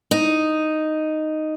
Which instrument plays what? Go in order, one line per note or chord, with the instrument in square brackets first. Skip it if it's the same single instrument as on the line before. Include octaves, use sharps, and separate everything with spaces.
[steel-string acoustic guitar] D#4